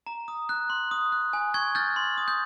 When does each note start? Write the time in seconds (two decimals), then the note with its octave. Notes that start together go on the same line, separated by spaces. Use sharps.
0.07 A#5
0.28 D#6
0.49 F#6
0.70 C6
0.91 D#6
1.12 F#6
1.33 G#5
1.54 C#6 G#6
1.75 F6 G6 A6
1.96 C6
2.18 D#6
2.28 G6